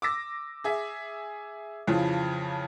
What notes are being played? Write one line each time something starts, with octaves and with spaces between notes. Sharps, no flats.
D6 E6 A#6
G#4 E5
F2 C#3 E3 F3